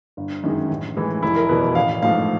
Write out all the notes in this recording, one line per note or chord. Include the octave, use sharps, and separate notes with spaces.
G1
F#2 D#3 G#3
A1
A2 E3 G#3
F1 E4
A#4
E2 B2 B4
A1 F5
G#2 F3 A3 F5